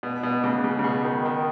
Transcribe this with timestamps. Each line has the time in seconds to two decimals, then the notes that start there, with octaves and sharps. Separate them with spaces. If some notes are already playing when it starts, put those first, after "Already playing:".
0.03 B2
0.23 B2
0.44 C#3
0.64 C#3
0.79 C#3
0.84 B2
1.04 D#3
1.25 D#3